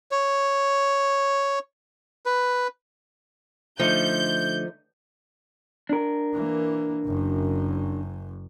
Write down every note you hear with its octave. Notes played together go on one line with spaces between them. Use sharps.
C#5
B4
D3 F3 A3 D#4 G6
D4 A#4
E3 A#3
F#1 F#2